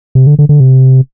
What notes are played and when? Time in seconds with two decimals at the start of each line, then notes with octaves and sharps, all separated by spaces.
0.15 C3
0.27 D3
0.39 D3
0.49 D3
0.60 C3